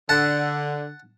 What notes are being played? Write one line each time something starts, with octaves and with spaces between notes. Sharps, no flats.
D3 F#5 A5